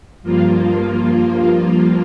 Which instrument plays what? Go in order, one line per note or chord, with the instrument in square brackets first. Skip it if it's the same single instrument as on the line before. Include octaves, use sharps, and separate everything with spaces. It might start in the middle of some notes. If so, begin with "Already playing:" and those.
[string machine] G2 F3 A#3 F4